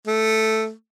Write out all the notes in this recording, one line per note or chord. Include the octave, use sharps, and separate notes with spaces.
A3